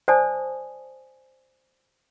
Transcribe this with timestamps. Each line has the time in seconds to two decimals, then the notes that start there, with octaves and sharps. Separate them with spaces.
0.08 C5 D5 G#5 A5 D#6